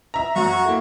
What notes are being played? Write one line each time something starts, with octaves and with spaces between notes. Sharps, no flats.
E5 A#5
F#2 F#3 F#4 C#6
A#3 E4 A4